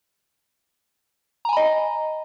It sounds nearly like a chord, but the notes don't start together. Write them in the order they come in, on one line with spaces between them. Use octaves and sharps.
A#5 G#5 B5 D#5